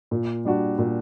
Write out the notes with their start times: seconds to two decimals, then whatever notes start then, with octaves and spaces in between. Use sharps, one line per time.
0.11 A#2
0.45 G3 D4 F#4
0.78 A#2